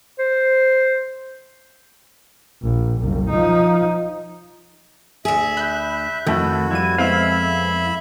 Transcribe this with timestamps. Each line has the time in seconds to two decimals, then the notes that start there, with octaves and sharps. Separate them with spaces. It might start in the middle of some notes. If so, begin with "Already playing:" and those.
0.19 C5
2.62 A#1
2.99 F#1 C2
3.29 F3 D#4
5.25 D2 G#4 E5
5.57 B5 F#6 G6
6.27 F2 D#3 A3 E4 F#4
6.71 F3 G3 E4 D#7
6.98 G#3 B3 C4 E4 E5 F5 B5